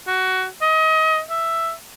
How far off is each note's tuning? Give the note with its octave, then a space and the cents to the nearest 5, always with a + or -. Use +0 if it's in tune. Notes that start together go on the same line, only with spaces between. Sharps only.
F#4 +15
D#5 +30
E5 +5